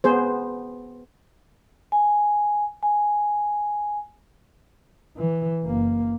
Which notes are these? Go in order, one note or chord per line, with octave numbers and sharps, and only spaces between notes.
B3 G#4 C5
G#5
G#5
E3
F#1 A#3